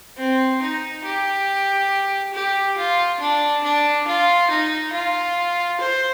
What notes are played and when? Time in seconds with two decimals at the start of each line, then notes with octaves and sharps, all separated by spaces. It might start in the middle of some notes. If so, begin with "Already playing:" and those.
0.17 C4
0.62 D#4
1.04 G4
2.33 G4
2.77 F4
3.20 D4
3.63 D4
4.07 F4
4.50 D#4
4.93 F4
5.80 C5